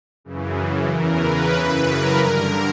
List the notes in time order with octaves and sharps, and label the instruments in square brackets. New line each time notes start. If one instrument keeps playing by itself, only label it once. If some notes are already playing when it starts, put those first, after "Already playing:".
[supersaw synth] F#2 C#3 E3
E2 C#3 E3 A#4
B4
F#2 C#3 E3
A#4
G2 D3